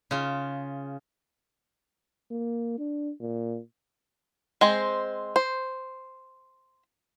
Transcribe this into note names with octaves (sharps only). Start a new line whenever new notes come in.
C#3 F4
A#3
D4
A#2
G#3 C4 C5
C5